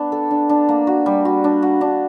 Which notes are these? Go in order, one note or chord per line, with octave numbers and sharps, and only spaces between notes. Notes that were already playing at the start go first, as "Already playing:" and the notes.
Already playing: B3 D4
A4
D4
D4
A#3
F#4
G3
F#4
D4
F#4
D4